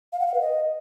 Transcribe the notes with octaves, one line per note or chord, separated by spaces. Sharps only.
F5
F#5
F5
B4
D#5